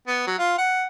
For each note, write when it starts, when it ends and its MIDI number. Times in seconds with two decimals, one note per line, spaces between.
0.07 0.22 59
0.27 0.37 54
0.38 0.57 65
0.58 0.86 78